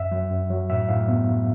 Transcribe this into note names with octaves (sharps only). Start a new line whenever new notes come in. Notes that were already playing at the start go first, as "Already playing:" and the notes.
Already playing: F#2 E5
F#3
F#2
F#3
A2 E5
A2 F5
B3
A2